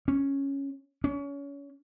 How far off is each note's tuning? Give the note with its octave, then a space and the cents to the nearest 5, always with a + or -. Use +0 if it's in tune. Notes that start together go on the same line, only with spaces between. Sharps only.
C#4 -5
C#4 +30